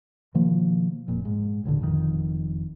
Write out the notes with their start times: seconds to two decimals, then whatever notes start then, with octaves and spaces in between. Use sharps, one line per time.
0.34 B2 D#3 F3 A#3
1.08 F1 A#2
1.25 G#2
1.64 E1 A1 A#2 D3
1.80 F#1 F2 G#2 D#3